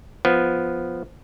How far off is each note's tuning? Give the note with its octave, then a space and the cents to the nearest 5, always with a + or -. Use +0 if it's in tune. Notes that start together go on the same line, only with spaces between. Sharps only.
F3 +0 B3 +0